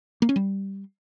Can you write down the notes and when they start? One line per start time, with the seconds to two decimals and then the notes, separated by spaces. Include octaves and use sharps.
0.22 A#3
0.29 C#4
0.36 G3